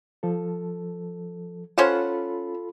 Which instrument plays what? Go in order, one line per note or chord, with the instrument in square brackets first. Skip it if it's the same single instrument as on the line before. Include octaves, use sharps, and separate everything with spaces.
[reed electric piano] F3 A4
[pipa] C#4 C5 F#5 [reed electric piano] F4 A4 B5